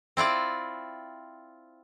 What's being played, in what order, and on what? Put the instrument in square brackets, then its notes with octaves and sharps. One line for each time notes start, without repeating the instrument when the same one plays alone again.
[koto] C4 E4 F4 D5